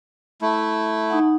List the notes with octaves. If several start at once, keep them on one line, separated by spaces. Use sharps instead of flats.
A3 E4
D#4 F#5